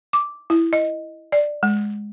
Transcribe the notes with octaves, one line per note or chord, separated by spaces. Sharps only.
D6
E4
D#5
D5
G#3